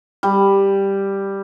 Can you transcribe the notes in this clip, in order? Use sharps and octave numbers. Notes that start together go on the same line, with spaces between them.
G3